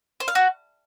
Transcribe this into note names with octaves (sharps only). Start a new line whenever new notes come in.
C5
F5
F#4